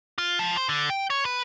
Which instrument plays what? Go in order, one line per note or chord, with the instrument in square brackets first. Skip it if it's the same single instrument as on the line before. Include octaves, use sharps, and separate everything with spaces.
[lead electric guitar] F4
F3
C5
D3
G5
C#5
B4